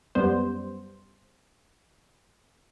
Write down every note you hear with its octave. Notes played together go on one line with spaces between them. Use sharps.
F#2 G3 B3 C5